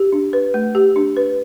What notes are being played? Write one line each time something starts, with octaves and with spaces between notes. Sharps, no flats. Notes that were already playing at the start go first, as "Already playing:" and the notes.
Already playing: G4
D4
B4
A3
G4
D4
B4